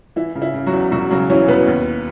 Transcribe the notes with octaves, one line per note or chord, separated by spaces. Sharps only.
E3 E4
C#3
E4
C#3
F#3 F#4
E2
E1 F#3 F#4
C#3 F#3 F#4
E3 C#4 C#5
E1 B3 B4
D#2